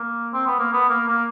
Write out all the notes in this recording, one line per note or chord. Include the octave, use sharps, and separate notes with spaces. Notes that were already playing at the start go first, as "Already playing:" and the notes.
Already playing: A#3
C4
B3
A#3
B3
A#3
A#3